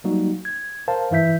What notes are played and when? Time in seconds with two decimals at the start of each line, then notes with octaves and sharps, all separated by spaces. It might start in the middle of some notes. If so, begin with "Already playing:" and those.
0.04 F#3 G3 A#3 D#4 F#4
0.45 G#6
0.88 A#4 C5 F5 A5
1.11 G2 E3 E4 E5 G6 B6